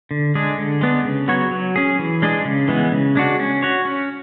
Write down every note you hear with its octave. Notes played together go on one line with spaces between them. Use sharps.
D3
G#3 D4 G#4
D3
G#3 B3 D4
C#3
F#3 B3 F#4 C#5
F#3
C#4 G#4
E3
G#3 D4 G#4
C#3
E3 G#3 B3
C#3
G#3 D4 F#4
C#4
F#4 C#5
C#4